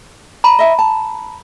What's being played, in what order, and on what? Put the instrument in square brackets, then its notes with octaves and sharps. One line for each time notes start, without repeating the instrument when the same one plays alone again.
[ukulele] D5 [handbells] A#5 B5
[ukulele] D#5 E5 G#5
A5